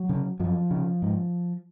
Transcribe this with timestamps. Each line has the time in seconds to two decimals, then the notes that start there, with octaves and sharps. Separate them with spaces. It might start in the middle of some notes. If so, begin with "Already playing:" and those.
Already playing: F#3
0.09 C#3
0.40 F#2 F3
0.71 C#3
1.02 G#2